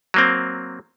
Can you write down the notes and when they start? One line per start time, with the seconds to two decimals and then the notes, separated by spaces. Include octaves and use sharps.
0.14 F#3 A#3 C4